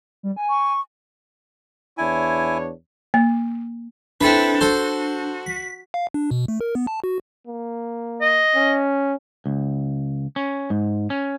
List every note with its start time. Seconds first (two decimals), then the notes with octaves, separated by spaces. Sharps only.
0.23 G3
0.36 G#5
0.49 C#6
1.98 E2 D4 E4 C#5 G#5
3.14 A#3
4.21 C4 D4 E4 A4 B4
4.61 F#4 A4 C5
5.46 B6
5.94 F5
6.14 D4
6.31 B2
6.48 A3
6.61 A#4
6.75 B3
6.87 A5
7.04 F#4
7.47 A#3
8.21 D#5
8.56 C#4
9.46 C#2
10.36 C#4
10.70 G#2
11.10 C#4